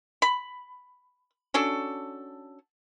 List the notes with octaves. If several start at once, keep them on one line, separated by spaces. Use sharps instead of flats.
B5
C#4 D4 F#4 A4